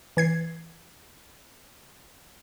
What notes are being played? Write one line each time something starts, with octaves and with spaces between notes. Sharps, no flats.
E3 G#6 C7